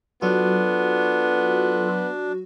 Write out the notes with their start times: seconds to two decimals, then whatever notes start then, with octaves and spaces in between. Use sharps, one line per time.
0.22 F#3 B3 D4 F4 F#4 A4